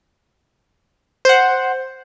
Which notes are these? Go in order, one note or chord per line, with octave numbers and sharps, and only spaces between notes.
C5 F#5